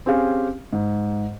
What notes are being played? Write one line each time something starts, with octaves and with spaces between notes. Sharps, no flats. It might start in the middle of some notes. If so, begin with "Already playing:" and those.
C4 C#4 G4 G#4 F5
G#2